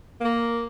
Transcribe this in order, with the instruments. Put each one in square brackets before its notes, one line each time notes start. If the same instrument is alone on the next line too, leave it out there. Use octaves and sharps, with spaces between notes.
[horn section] A#3